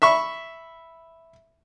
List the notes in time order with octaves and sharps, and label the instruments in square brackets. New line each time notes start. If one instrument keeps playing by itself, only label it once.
[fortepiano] E5 B5 C#6